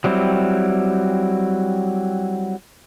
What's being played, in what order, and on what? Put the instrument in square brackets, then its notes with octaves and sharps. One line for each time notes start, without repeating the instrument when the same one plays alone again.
[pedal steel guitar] F#3 G3 C4 E4